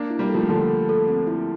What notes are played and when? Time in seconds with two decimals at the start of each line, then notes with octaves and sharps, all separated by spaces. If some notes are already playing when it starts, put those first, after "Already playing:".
Already playing: A#3 D4
0.10 E4
0.19 G3 A#3
0.29 A4
0.34 F3 A3
0.49 D3 F3 A4
0.69 A4
0.89 A4
1.08 C4
1.27 E4